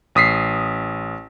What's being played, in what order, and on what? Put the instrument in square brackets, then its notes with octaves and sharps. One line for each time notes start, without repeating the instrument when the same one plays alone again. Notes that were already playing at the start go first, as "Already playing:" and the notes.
[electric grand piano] A1 D#6 B6 C7